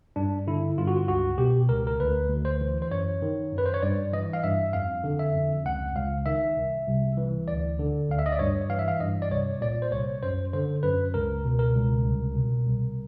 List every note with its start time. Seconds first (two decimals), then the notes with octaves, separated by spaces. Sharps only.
0.16 G2 D4
0.47 D3 E4
0.78 G2 F4
0.87 F#4
0.96 F4
1.08 C#2 F#4
1.38 B2 G4
1.69 C#2 A#4
1.87 A#4
2.00 D2 B4
2.29 D2
2.45 C5
2.61 E3
2.82 C5
2.91 F#2 C#5
3.22 D#3
3.52 F#2
3.58 B4
3.66 C5
3.74 C#5
3.83 G2 D5
4.13 E3 D#5
4.33 F5
4.44 G2 E5
4.73 F2 F5
5.04 D3
5.19 E5
5.35 F2
5.65 C#2 F#5
5.96 C#2 F5
6.26 D#3 E5
6.57 C2
6.87 C2
7.17 E3
7.48 D2 D5
7.79 D3
8.09 D2 F5
8.19 E5
8.26 D#5
8.32 D5
8.39 G2 C#5
8.69 E3 F5
8.79 E5
8.88 F5
9.00 G2 D#5
9.22 D5
9.30 C2 C#5
9.61 A#2 D5
9.82 C5
9.92 C2 C#5
10.23 F#2 C5
10.53 D3 C5
10.83 F#2 B4
11.14 C#2 A#4
11.45 B2
11.59 A#4
11.76 C#2
12.06 C2
12.35 B2
12.67 C2